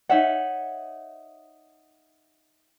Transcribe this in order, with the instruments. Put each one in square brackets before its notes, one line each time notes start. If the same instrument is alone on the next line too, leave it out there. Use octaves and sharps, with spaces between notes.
[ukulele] D#4 C#5 E5 F#5